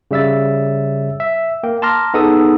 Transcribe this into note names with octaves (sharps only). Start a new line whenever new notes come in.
C#3 G3 E5 E6 A6
E5
A#3 G5
A5 A#5 C6 D6 F6 A#6
B3 D#4 G#4 A4 D#6